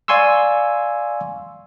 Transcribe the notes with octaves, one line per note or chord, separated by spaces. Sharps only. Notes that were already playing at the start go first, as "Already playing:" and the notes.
D5 F5 G#5 C6 C#6 E6